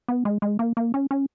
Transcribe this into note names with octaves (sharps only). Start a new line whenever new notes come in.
B3
G#3
G#3
A#3
A#3
C#4
C#4